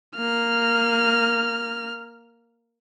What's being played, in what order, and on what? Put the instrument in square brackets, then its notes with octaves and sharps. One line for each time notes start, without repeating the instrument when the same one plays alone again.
[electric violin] A#3 F6